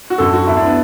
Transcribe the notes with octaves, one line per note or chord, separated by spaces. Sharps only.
F#4
F#2 D3 A4
F#4
D2 D3 E4
D4
B3